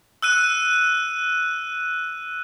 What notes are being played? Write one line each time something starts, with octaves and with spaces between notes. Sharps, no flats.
E6 F#6 D#7